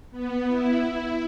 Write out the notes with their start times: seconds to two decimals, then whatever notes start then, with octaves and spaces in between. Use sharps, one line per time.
0.11 B3
0.47 E4